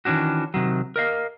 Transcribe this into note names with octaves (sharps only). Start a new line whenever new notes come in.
D#3 E3 C#4 D4 F#4
C3 D#3 F#3
A#4 D#5 F5